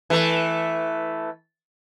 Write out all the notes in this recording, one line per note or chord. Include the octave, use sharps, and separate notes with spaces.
E3 A3